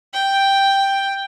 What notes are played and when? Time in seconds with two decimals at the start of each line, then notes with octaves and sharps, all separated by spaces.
0.14 G5